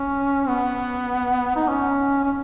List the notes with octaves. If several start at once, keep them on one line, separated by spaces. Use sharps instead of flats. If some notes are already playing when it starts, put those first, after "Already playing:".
Already playing: C#4
B3
D#4
C#4
C#4